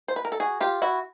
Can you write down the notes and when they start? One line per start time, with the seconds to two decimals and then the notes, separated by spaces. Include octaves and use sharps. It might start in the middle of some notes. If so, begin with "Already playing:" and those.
0.08 C5
0.16 B4
0.25 A#4
0.32 A4
0.40 F#4 G#4
0.61 F4 G4
0.82 E4 F#4